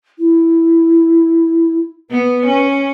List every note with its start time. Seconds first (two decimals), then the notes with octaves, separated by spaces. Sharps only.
0.19 E4
2.11 B3 B4
2.46 C#4